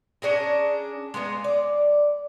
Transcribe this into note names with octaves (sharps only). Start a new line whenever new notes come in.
C#4 D4 G#4 A#4
G#3 A#3 B3 G#4
D5